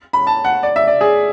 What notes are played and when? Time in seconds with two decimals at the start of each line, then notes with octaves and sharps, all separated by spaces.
0.13 B5
0.27 A5
0.44 F#5
0.63 D5
0.76 E5
0.87 D5
1.01 G#4